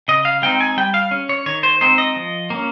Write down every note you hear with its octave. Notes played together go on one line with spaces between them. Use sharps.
C#3 D#5
F5
G#3 C4 D#4 G5
G#5
G3 G5
F5
C#4
C#5
D#3 C#5
C5
G#3 C4 D#4 C5
D#5
F3
A#3 C#4